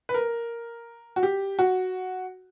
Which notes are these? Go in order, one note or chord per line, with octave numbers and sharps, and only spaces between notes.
B4
A#4
F#4
G4
F#4